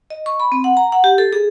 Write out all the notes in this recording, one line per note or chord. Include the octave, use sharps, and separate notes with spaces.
D#5
C#6
B5
C4
F#5
A#5
F#5
G4
A4
G#4